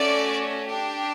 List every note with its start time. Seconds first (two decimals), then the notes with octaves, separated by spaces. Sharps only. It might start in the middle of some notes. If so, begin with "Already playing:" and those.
Already playing: A3 C#4 F#4 D5
0.66 D4 G4